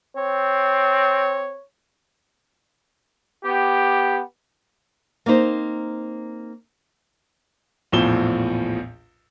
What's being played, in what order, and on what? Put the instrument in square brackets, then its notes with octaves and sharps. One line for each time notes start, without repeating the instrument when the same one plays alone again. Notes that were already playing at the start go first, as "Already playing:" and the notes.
[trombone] C4 [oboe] C#5
[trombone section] B3 G4
[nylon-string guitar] A#3 C4 D#4 C5
[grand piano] A#1 E2 A2 F3 E7 G7